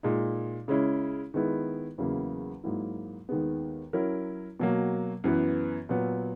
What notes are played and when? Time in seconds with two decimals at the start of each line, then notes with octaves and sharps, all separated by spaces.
0.03 A#2 G#3 D#4
0.68 C#3 G#3 C#4 E4
1.34 D#3 G#3 B3 E4
1.98 E2 C#3 F#3 A#3 E4
2.64 G#2 F#3 A#3 E4
3.29 D#2 D#3 G#3 B3
3.93 F#3 C#4 E4 A#4
4.60 B2 F#3 A#3
5.24 F#2 E3 B3
5.89 A#2 F#3 B3 F#4